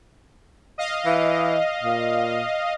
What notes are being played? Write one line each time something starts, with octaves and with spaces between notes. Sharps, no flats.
D#5 F5
E3
A#2